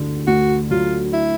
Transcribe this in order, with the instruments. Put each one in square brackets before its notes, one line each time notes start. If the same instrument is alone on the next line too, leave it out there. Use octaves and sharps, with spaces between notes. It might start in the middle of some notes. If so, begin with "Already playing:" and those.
Already playing: [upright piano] D2 D3
[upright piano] D2 [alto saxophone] F#4
[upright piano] F#3 [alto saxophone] F4
[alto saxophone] E4